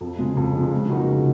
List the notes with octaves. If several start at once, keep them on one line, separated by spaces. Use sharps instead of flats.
F2
C#3 F3 G#3
F2
C#3 F3 G#3
C#3
F3 A#3 D#4 F#4
C#3